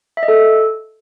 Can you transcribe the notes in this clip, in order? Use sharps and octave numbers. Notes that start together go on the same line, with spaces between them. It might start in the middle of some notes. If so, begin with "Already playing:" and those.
E5
D#5
A4